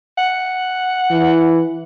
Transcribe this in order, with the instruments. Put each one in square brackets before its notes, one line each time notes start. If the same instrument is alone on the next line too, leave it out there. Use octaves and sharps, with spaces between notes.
[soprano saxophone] F#5
[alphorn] E3